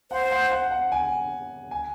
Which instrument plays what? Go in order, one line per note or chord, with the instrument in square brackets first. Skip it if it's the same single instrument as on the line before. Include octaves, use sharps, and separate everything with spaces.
[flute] C5 [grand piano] F#5
[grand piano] F#5
F#5
F#5
G#5
G#5